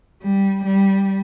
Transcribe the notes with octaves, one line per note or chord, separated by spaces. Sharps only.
G3
G3